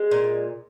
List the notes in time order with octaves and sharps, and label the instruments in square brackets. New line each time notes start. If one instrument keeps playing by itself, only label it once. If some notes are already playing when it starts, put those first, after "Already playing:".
Already playing: [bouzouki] G#3
A#2